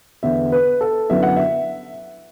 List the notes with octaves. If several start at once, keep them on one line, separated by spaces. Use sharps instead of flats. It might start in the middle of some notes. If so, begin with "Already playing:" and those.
E2 D3 B3 E5
B4
A4
F#2 D3 F#3 B3 E4 E5
F#5
E5